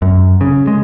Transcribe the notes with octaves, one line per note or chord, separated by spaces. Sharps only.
F#2
C#3
G#3